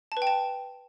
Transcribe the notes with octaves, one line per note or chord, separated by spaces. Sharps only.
A5
B4
G5
A5